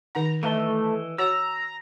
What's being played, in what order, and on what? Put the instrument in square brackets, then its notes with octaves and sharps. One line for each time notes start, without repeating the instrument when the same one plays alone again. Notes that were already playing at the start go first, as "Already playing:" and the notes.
[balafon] D#3 D#4 F#5 [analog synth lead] A#5
[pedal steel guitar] E3 D#5 [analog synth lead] A3 [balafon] B4
[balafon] F#4 C#5 F#5 [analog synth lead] A#5 [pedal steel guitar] E6